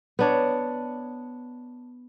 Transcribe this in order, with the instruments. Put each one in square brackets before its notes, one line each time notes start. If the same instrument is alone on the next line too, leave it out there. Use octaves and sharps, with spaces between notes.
[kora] B3 D4 C#5